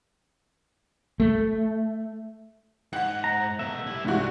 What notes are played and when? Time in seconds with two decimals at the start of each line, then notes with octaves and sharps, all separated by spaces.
1.20 A3
2.93 G#2 F#5
3.24 A#5
3.59 B2 A3 E5
3.87 G3 E4
4.05 C2 G#2 F#4